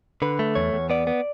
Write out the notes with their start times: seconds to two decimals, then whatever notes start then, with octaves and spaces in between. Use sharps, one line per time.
0.22 D3 B4
0.39 A3
0.55 E2 C#5
0.73 E2
0.90 B3 D5
1.07 B3